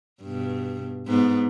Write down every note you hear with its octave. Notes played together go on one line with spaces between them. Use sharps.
G2 B2
G#2 B3